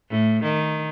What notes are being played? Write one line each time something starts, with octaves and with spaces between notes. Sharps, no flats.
A2
D#3